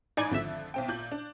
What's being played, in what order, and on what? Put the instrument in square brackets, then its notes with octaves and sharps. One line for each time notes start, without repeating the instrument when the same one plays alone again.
[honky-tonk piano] A1 G#2 B5 [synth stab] D#4 D5 G#5
[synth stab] G#1 E5 [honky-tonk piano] F2 D3 F3
[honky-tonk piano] B1 C4 G5
A#2 G6 F#7
D4